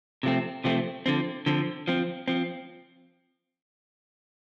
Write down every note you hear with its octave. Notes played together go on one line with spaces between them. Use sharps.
C3 F3 A3 C4
C3 F3 A3 C4
D3 F3 C4
D3 F3 C4
F3 C4
F3 C4